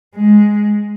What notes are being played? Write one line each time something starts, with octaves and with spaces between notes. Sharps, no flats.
G#3